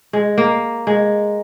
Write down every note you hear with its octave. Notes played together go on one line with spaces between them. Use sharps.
G#3
A#3
G#3